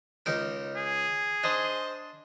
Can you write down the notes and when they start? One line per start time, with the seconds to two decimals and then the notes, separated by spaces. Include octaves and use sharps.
0.26 C#2 D#4 A#4
0.76 G#4
1.44 D4 C5 D#5